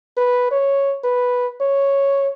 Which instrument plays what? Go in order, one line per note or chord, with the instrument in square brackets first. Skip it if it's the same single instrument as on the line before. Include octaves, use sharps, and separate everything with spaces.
[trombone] B4
C#5
B4
C#5